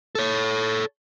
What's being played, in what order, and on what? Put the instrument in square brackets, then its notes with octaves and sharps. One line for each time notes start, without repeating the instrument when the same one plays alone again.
[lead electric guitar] A4 C#5